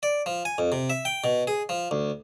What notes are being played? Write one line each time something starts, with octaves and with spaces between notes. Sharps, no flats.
D5
F3
G#5
F2
C3
E5
G5
B2
G#4
F3
D2